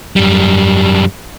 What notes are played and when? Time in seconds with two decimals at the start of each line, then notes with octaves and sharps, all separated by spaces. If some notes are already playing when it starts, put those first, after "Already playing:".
0.16 F#2 G3